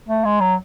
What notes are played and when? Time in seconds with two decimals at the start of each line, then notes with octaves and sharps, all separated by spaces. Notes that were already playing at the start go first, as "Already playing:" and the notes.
0.08 A3
0.24 G#3
0.40 F#3